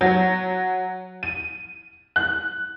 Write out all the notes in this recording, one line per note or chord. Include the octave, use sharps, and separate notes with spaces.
F#3
D#7
F#6